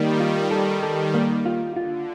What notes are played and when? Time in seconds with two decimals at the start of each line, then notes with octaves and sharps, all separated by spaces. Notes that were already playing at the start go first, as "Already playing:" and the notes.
Already playing: D#3 G3 A#3
0.20 F4
0.51 A4
0.83 D#3 G3 A4
1.14 A#3
1.46 F4
1.76 D3 F4